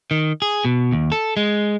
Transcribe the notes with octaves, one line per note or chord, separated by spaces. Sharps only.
D#3
G#4
B2
D#2
A4
G#3